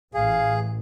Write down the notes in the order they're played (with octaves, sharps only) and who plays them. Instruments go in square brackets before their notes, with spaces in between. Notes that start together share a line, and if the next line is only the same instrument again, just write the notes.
[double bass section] A1 A2 E3 [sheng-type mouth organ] G#4 [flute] F5